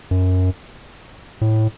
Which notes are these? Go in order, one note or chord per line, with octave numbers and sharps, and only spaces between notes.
F#2
A2